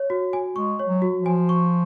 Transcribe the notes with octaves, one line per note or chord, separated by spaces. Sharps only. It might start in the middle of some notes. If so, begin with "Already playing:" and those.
Already playing: C#5
F#4
G#5
G#3 C#6
C#5
F#3
F#4
F3
G#5
C#6